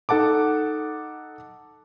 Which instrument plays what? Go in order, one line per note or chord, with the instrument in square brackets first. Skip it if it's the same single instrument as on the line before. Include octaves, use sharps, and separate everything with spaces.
[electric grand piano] D#4 A4 F#5 A5 D6